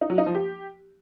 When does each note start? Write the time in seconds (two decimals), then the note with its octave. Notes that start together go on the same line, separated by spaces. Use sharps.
0.01 D#4
0.10 F#3
0.18 D#4
0.26 F3
0.35 G4